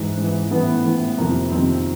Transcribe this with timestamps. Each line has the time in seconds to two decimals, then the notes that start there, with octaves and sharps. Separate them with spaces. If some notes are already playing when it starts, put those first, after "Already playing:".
Already playing: G#2 E3
0.17 G#2 E3
0.51 A2 E3 B3
0.85 A2 E3
1.18 F2 C3 D#3 A#3
1.51 F2 C3 D#3 C4